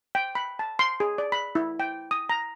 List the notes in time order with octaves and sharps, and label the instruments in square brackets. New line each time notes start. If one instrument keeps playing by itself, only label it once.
[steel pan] G5
B5
A5
C6
G#4
D5
B5
E4
G5
D#6
A#5